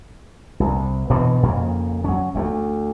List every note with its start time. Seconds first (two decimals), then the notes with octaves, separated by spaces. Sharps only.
0.60 C2
1.10 G2 B2 E3
1.43 F2 C#3 A#3
2.04 F#3 C#4
2.35 D2 G3 A3